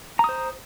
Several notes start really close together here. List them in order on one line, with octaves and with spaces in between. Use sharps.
A#5 D#6 C5